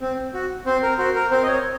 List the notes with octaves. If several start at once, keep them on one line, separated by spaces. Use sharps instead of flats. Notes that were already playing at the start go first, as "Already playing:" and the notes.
C4
F#4
C4 C5
A#4
F#4 C5
A#4
C4 C5
D#5
C#5